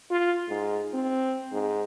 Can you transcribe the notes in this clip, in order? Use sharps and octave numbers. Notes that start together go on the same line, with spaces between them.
F4
G#2
C4
G#2